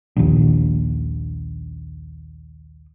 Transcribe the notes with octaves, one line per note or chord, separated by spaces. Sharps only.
A#1 D#2